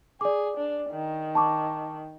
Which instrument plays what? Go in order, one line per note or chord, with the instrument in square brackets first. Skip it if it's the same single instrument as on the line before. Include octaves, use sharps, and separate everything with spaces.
[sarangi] G#4 [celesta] D5 D6
[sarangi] D4
D#3
[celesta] A5 C#6 D6